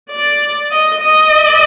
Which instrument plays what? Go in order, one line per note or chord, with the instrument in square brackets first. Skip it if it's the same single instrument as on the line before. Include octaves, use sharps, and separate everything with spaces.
[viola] D5
D#5
D#5